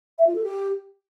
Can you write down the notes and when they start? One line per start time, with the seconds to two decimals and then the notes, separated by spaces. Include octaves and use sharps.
0.18 E5
0.27 F4
0.35 A4
0.44 G4